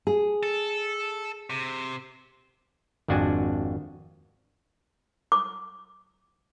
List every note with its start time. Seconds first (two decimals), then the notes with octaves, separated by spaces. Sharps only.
0.07 G#4
0.43 A4
1.50 C3
3.08 G#1 F2 D4 F#4 G#5
5.32 D6